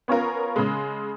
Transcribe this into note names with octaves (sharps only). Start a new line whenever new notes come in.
B3 C#4 F4 A#4
C#3 G#3